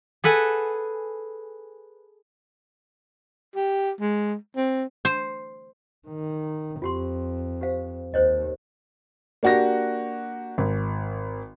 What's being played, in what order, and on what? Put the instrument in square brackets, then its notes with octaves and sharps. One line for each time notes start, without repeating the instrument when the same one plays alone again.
[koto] G#4 A4 B4 F#5 G#5
[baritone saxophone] G4
G#3
C4
[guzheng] C5
[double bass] D#3
[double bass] F2 [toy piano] F4 G4 C6
[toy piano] G4 C5 F5
[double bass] D#2 [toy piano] C5 C#5 D#5
[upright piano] A#3 D4 F#4 G4 A#6
G#1